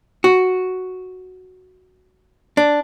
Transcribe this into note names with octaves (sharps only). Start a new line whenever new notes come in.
F#4
D4